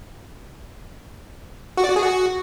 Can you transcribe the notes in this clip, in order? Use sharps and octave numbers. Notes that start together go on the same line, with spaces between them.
F#4
D5
F#4
G#4
F#4